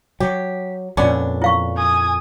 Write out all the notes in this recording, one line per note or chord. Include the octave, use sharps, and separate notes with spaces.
F#3 G4
F2 A#2 B3 C#4 D4
E4 F5 C#6
G#5 D#6